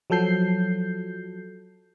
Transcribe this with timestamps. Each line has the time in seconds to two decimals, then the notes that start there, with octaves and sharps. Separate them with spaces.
0.10 F3 F#3 A4 G6 C7